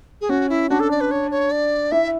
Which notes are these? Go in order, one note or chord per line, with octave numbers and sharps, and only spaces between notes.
G#4
C#4 F#4
E4
D4 F#4
A4
D5
B4
C#5
C#5
D5
E4 E5